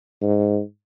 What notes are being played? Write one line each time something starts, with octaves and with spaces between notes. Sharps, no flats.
G#2